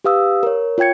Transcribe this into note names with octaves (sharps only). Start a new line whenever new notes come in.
G4 B4 F5 D#6 E6
A#4 C#5
F4 C#5 G5 G#6 C#7